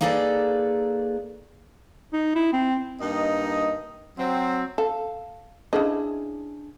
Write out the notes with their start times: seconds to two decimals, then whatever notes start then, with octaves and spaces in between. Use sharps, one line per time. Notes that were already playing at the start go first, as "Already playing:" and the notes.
0.01 A#3 D#4 G#4 A4 B4 D5
2.13 D#4
2.35 E4
2.53 C4
3.01 G2 A#3 D#4 D#5
4.18 F#3 C4
4.78 A4 F5
5.73 C#3 D4 E4 G#4 D#5